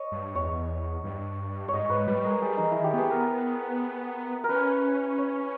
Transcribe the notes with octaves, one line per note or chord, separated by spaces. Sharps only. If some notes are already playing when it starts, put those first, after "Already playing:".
Already playing: C#5 D#5
G2
E2 C#5
G2
G#2 C#5 D#5
G#2 B4
G3 B4
G#3 A#4
G3 G#4
E3 D#4
D#3 E4
G4
B3 G#4
A#4
A#4
C#4 B4
C#5